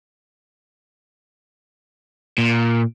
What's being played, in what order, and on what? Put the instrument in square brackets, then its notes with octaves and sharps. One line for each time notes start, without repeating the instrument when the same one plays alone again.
[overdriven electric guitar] A#2